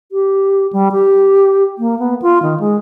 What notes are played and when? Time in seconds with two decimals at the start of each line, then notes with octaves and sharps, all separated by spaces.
0.12 G4
0.73 G3
0.92 G4
1.78 A#3
1.99 B3
2.22 F4
2.43 D#3
2.60 G#3